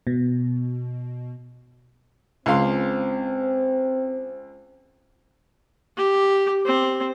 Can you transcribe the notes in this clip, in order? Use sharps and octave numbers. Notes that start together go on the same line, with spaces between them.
B2
C#2 C4 F5 C6
G4
C4